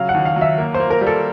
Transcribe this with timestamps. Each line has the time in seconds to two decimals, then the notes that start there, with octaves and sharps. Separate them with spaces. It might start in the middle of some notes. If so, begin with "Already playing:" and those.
Already playing: C#3 F#3 F5
0.09 F#5
0.14 D#2
0.25 F5
0.36 F#3
0.41 E5
0.58 A#3
0.74 C5
0.80 A#3
0.90 A#4
1.01 G3
1.07 A4